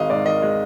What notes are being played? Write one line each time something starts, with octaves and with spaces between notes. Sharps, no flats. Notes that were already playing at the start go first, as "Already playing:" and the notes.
Already playing: G#1 G#3 D#5 F5
G#2 D5
D#3 D#5
G#3